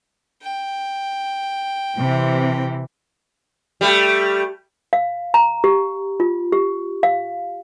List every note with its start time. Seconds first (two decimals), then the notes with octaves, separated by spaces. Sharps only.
0.42 G5
1.97 C3 E3
3.81 G3 A3
4.93 F5
5.34 A#5
5.64 G4
6.20 F4
6.52 G4
7.03 F5